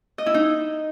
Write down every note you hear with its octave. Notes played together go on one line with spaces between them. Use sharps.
D#5
E4
D#4